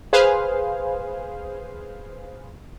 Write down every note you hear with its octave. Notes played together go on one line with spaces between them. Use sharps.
G#4 B4 C5 F5